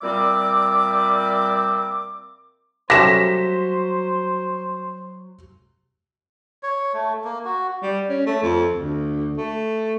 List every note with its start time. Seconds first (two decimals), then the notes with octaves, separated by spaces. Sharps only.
0.02 A#2 G3 C4 D5 E5 D6
2.90 F#3 G3 A3 C#4 C5 A#6 B6 E7
6.63 C#5
6.94 A3
7.24 A#3
7.45 F#4
7.82 G3
8.09 C#4
8.26 A3
8.43 F2
8.71 D2
9.37 A3